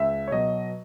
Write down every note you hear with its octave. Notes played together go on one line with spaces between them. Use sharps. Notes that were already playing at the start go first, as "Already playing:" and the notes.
Already playing: C#2 E5
C#5
B2 F#3 D#5